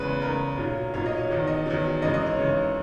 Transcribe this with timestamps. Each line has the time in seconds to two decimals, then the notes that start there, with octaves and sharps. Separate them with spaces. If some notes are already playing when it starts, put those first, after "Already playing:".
Already playing: E2 C#3 G#3 B4
0.21 E2 C#3 G#3 A#4
0.57 B1 A#2 F#3
0.94 B1 A#2 F#3 C#5
1.06 D#5
1.17 C#5
1.29 E2 D#3 F#3
1.47 D#5
1.66 E2 D#3 F#3
2.02 G#1 F#2 E3 G#3 D#5
2.14 D#5
2.26 C#5
2.38 G#1 F#2 E3 G#3